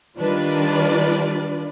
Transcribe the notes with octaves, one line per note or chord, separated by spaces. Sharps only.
D#3 G3 D4 F4 B4 D5